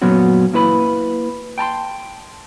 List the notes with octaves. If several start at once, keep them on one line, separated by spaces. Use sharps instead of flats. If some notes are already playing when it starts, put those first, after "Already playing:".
F#2 A#2 F#3 B3 C#4 F#4
A#3 E4 B4 B5
G5 A5 A#5 C6